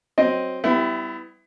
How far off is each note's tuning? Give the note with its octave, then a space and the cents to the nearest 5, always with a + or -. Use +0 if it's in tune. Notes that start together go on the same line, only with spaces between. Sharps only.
F#3 +0 C4 +0 D#5 +0
G3 +0 B3 +35 E4 +0